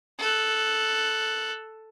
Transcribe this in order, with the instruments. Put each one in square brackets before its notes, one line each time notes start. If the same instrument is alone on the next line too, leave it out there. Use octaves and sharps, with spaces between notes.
[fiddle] A4 F#6